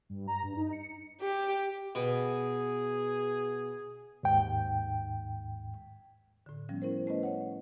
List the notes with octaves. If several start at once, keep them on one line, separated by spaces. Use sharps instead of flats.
G2
A#5
G2
D#4
C#7
G4
B2 G#4
D#2 G#2 G5
A2 D3
F3 G3 B3 C#4
C#4 E4 A#4 C5
A3 C#4 B4 D#5
C#5 F#5